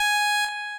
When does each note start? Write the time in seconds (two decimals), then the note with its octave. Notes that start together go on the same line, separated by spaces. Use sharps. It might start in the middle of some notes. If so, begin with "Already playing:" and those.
Already playing: G#5